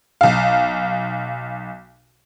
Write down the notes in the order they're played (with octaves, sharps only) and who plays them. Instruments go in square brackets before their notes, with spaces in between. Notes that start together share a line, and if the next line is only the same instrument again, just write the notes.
[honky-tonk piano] B1 F5